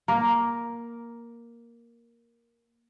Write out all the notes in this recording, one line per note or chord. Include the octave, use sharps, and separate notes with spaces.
A#3 A#4